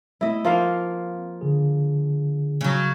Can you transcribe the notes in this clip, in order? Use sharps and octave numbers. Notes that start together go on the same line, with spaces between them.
A3 B3 C4 E4 D#5
F3 A#3 C4 F5
D3 G#4
C#3 F#3